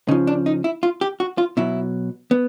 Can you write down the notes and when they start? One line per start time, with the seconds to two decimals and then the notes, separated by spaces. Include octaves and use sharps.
0.08 C#3 D#4
0.11 F3
0.27 D4
0.46 D#4
0.64 E4
0.83 F4
1.01 G4
1.20 F#4
1.38 F4
1.57 B2 F#3 E4
2.31 B3